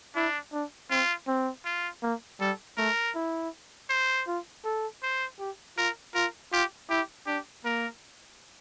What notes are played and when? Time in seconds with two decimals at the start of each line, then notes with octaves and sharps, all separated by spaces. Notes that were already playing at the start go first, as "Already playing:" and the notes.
0.15 D4 E4
0.53 D4
0.90 C4 F4
1.28 C4
1.65 F4
2.03 A#3
2.40 G3 A4
2.77 A3 A#4
3.15 E4
3.90 C5
4.27 F4
4.65 A4
5.03 C5
5.39 G4
5.78 F4 A#4
6.15 F4 A#4
6.52 F4 G4
6.90 E4 G4
7.27 D4 G4
7.65 A#3 A#4